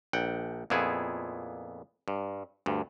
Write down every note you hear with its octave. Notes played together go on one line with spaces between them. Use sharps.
A#1 F#5 G5
F2 A#2 B3 E4 G#4
G2
D2 G2